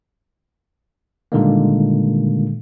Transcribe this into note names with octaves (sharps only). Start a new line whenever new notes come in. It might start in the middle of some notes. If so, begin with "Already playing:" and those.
A#2 D3 D#3 G3 G#3 A#3